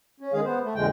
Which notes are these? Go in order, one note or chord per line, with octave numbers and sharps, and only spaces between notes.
C#4
D#3 G#3 G#4 F5
B3 C5
A3
F2 A#2 D3 G#3 G5